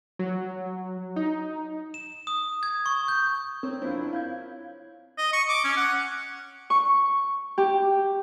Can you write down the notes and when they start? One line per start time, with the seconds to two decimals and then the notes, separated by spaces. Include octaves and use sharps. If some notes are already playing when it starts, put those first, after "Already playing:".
0.19 F#3
1.16 D#4
1.94 E7
2.27 D#6
2.63 G#6
2.86 C#6
3.08 G6
3.63 C4 A#4 C#5
3.82 C4 D4 E4 F4
4.13 F5 G6 G#6
5.18 D#5
5.33 C#6
5.49 D6
5.64 C#4
5.77 F#5
6.70 C#6
7.58 G4